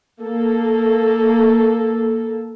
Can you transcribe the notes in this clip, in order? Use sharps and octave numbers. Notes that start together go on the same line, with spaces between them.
A#3 A4